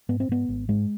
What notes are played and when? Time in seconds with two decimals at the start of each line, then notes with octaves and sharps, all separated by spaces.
0.09 G#2 B3
0.20 C4
0.29 G#2 B3
0.49 G#1
0.69 G#2 G#3